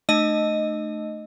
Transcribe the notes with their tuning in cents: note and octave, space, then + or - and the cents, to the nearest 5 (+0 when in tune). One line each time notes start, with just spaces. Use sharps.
A3 -10 D#4 -45 D#5 +0